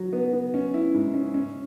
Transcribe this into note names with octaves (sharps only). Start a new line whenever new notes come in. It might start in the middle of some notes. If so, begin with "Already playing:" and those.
Already playing: F#3 F#4
B3
B3
C#4
E4
G#2
C#4
C#4